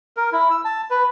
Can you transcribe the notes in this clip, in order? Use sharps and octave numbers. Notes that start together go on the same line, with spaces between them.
A#4
E4
E6
A5
B4